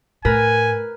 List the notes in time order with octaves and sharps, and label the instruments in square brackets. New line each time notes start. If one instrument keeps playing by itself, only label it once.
[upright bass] A2 [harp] A#4 B4 [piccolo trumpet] G#5